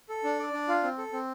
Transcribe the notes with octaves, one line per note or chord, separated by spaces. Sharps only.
A4
D4
D5
D4
F4
C4
A4
C4